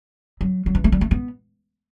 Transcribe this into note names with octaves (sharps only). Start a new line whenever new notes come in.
F#3
F#3
E3
A3
G3
A3
B3